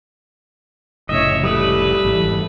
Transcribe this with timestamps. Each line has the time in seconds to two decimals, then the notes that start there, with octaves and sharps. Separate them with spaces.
1.09 F1 A2 C#3 C#5 D#5 E5
1.44 G3 A3 B4 D#6
2.05 G#1 B2 E3